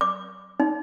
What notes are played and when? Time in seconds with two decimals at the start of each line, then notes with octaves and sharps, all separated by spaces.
0.01 D6
0.60 D#4